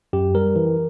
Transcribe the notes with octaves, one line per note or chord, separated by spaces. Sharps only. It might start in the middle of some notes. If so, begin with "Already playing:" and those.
F#2 G4
G3 A#4
E3